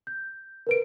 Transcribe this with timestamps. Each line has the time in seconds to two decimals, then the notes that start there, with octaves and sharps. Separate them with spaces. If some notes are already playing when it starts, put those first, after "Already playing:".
0.07 G6
0.67 A#4 B4 D7